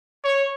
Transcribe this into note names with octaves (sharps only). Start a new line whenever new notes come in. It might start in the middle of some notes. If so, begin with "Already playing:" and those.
C#5